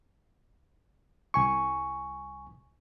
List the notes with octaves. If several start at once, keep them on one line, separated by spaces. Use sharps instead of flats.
C2 G#5 C#6